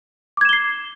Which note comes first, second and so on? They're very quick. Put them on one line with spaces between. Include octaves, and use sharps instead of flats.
D6 G#6 E7 G7 C7